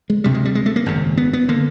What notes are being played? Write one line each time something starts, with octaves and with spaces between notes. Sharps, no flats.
G#3
D2 C3 G3
G#3
G3
G#3
A3
A#3
G#1 F#2 C#3
B3
B3
D3 A#3